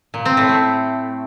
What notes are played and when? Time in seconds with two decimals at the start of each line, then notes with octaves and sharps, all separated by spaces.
0.14 A#2
0.25 C4
0.37 A2
0.49 A3